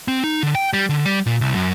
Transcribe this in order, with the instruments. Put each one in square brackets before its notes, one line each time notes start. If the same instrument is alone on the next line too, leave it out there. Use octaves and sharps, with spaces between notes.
[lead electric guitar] C4
D#4
D3
G5
G3
D3
G3
A#2
C2
F#2